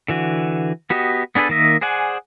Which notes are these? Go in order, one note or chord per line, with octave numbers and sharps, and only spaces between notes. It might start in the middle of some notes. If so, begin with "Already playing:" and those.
D3 E3 F#4
B3 F#4 G4 D#5
B3 D4 G#4 A4 B4
D#3 A#3 D#5 E5
G#4 C5 D5 F#5 G#5